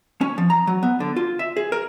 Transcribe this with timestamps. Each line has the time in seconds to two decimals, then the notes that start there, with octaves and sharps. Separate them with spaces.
0.21 C#4
0.38 F3
0.50 A#5
0.67 F#3
0.83 B3
1.00 D3
1.16 F4
1.39 E5
1.57 G#4
1.72 A#4